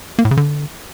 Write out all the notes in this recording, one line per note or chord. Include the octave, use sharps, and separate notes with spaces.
A#3
A2
C#3
D3